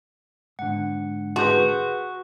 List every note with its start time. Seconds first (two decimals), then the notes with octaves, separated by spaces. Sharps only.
0.59 G#2 D3 F#5
1.36 F#4 G#4 B4 C6 G6